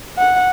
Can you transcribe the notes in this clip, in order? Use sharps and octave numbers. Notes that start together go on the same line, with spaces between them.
F#5